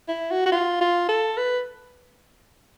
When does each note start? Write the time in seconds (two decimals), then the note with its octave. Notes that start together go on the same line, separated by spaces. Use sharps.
0.08 E4
0.31 F#4
0.46 F#4
0.52 F4
0.81 F4
1.09 A4
1.37 B4